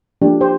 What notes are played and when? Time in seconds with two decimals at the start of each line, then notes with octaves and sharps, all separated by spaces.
0.21 F3 A#3 D4 G4
0.41 G4 C5